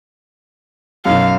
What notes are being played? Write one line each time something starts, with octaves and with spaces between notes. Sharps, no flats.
B1 F#2 F5